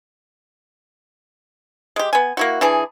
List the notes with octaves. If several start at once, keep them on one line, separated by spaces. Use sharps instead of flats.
G#3 G4
B3 G#5
A#3 E4 F#4
E3 D4 G#4